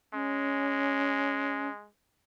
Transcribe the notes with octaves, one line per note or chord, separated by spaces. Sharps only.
G#3 C#4